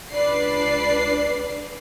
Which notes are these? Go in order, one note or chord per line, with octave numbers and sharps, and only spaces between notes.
C#2 D4 B4 D5 C7